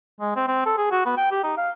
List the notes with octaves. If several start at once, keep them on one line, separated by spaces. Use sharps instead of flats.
G#3
C4
C4
A4
G#4
F#4
B3
G5
G4
D#4
F5